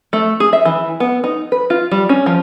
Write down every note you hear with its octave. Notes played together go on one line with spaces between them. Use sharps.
A3
G#4
E5
E3
B3
D#4
B4
F4
G3
C#4
F3